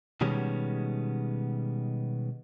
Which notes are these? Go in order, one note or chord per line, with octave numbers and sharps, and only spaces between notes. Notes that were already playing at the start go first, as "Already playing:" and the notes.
B2 D#3 G3 G#3 B3 C#4